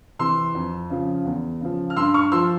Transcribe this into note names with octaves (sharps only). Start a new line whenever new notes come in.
C3 E3 C6 E6
F2
C#3 F3
E2
C#3 F3
F6
G2 C6 E6
C#6 F6
F3 C6 E6